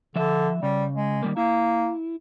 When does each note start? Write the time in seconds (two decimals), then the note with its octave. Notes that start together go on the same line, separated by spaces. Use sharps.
0.16 D3 F3 E5
0.63 C#3 G3
0.96 G#3
1.23 D#3 G3 A#3
1.37 A#3 E4